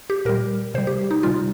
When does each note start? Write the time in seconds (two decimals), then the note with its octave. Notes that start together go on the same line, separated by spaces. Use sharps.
0.10 G4
0.25 A#2 G3 A#4
0.74 C3 C5
0.78 G3
0.87 G4
1.11 D#4
1.23 C3 G3 F4